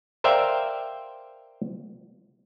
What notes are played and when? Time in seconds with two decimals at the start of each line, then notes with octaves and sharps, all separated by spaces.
0.24 A#4 C5 D5 E5 F5 G5